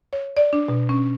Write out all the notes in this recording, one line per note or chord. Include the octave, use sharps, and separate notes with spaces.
C#5
D5
D4
B2
C#4